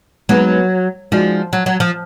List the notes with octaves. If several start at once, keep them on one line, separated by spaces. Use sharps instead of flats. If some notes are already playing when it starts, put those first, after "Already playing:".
F#3 G#3 B3 D#4 G#4 B4
F3 G#3 D#4 F#4 D5
F#3
F#3
F3